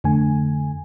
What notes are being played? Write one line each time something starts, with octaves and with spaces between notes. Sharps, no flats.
F2 D3 A3 G#5